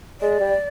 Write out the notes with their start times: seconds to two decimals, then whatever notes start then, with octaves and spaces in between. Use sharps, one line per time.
0.21 G#3 D5
0.40 G3